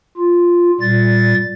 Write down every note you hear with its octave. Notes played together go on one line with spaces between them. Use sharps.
F4
A#2 G3 A6